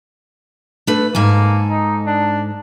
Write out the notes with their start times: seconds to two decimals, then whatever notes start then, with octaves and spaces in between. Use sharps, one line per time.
0.87 A3 D4 B4
1.15 G#2 A#3 A4 G#5
1.70 D#4
2.07 D4